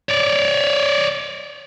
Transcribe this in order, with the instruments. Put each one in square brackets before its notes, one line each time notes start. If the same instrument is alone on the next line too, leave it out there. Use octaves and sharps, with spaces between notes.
[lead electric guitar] C#5 D5